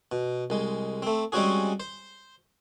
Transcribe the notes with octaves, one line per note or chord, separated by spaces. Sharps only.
B2
C2 G#3
A3 C4
G3 G#3 C4 C#4 F#4 G#4
C5